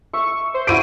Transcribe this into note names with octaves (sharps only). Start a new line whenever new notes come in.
E5 C#6
C5
E4 F#4 D5 D7 D#7